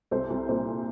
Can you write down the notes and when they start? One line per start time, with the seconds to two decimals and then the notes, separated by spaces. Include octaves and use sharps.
0.11 C2 A4 C5
0.30 C2
0.49 A#2 A4 C5